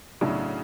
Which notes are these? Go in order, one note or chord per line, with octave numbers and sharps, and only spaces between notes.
B1 A2 C#3 F#3 A3 D4